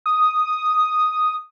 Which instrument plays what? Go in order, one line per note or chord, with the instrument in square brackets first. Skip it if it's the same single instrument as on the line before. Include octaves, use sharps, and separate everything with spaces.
[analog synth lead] D#6